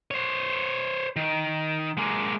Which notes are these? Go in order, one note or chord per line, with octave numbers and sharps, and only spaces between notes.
C5 C#5
D#3
G#3 A#3